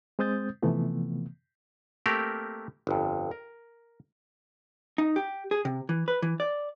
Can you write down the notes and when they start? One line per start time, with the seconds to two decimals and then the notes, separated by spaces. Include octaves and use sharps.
0.19 G#3 C4 C5 D#6 G6 A6
0.62 C3 E3 F3 A3 B3
2.06 A3 A#3 C4 G4 A#4
2.87 G1 F2
3.31 A#4
4.98 D#4
5.16 G4
5.51 G#4
5.65 C3
5.89 E3
6.08 B4
6.22 E3
6.40 D5